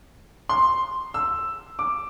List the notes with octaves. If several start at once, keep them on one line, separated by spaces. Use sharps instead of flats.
C6
E6
D6